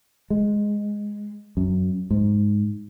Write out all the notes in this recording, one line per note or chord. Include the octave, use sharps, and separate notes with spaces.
G#3
F#2
G#2